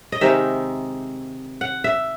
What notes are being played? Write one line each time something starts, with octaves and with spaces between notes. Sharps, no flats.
D#5
C3 D#3 G#3 D#4 E5
F#5
E5